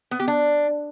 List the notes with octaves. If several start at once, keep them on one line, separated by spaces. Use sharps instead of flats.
B3
G4
D4